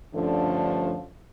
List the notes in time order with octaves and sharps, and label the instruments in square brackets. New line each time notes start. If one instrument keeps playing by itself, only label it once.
[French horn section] G2 D3 F3 A3 C#4